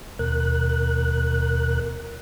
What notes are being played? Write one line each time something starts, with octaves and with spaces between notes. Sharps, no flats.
D#2 B2 A#4 F#6